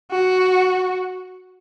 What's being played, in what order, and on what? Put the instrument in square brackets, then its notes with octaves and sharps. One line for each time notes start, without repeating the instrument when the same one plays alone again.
[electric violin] F#4